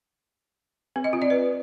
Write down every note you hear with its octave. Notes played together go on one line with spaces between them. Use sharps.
C4
D#5
F4
D5
B4